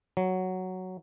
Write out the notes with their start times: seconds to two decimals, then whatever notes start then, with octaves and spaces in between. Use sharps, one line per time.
0.17 F#3